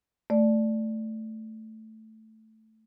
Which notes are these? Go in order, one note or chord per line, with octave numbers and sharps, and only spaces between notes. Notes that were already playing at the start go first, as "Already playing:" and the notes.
A3 D5